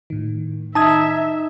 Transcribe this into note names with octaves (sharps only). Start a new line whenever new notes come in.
A2 D#3
D#4 E5 A5 D#6 G#6